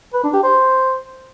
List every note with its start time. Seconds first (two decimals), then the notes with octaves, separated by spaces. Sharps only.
0.14 B4
0.24 D4
0.33 G4
0.43 C5